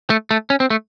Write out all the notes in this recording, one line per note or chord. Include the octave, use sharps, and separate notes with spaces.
A3
A3
C#4
C4
A3